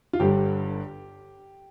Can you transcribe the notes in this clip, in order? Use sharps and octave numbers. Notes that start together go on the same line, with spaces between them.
F4
G1 G2 D3 G3 G4